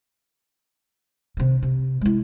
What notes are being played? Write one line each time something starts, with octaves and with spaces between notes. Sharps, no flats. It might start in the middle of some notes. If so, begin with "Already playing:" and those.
C3 D#3
C3
G#3 E4